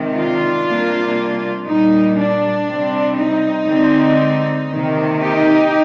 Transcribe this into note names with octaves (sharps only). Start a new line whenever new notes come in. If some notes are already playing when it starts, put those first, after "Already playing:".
Already playing: C3 D#3 G#3
D4 F4
C3 G3 A#3
A#2 G3 A#3 D#4
D4
C3 G3 C4
D#4
D3 G#3 C4
C3 D#3 A#3
D#4 G4